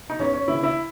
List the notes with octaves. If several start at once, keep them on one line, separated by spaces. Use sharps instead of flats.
D#4
E2 C#4
C#4
C#3 E3 E4
E4